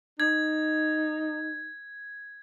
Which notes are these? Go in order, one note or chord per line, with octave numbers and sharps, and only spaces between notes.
D#4 G#6